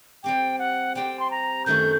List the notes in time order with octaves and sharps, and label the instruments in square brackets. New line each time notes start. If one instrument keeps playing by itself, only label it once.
[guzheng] G3 C4 G4 [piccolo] G5
[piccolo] F#5
[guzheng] G3 C4 G4 [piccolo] G5
[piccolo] C6
A#5
[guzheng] F#2 D#3 A3 D#4 F#4 [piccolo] G6